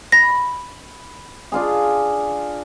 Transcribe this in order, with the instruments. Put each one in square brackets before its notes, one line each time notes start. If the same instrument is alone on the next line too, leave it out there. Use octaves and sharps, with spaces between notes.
[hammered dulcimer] B5 [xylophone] A#6
[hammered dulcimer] D4 F4 G#4